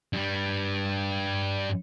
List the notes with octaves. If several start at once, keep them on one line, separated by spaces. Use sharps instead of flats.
G2 G3